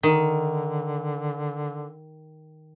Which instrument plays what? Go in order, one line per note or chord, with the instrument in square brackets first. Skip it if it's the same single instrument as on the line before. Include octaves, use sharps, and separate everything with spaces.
[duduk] D3 [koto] D#3